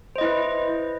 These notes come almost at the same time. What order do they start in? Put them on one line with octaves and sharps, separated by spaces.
C5 D#5 E4 B4